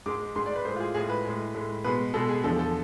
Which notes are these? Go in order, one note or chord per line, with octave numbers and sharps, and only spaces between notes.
G#2 G#3 D6
G#2 G#3 C6
D5
B4
A2 G#3 C5
F4
G#4
A2 G#3 G#4
B4
A2 G#3
A2 G#3
B2 G#3 B4
B2 G#3 A4
G#4
E2 D3 F3 A4
A4